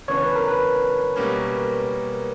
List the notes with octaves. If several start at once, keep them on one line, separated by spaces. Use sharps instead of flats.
C#3 E3 B3 D4 C#5
B4
A#4
B4
B2 G3 A#3 C#4